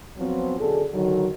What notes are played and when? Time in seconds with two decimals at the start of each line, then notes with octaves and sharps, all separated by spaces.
0.18 F3 F#3 B3 C4
0.58 F#2 B2 D3 G#4 A4
0.92 D3 D#3 F#3